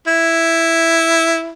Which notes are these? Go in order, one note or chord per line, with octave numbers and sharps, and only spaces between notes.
E4